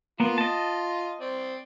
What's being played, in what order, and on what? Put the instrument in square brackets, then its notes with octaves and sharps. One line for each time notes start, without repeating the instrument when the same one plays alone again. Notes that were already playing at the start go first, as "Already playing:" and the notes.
[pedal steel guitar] A#3 B3 [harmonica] F4
[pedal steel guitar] D#5 A5
[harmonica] C4 D5